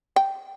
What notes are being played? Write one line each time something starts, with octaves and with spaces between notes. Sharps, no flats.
G5